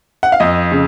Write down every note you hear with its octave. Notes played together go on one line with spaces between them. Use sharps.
F#5
F5
F2 D#5
C#3